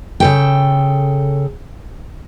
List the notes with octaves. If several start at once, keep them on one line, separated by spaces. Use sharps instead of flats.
C#3 A4 G5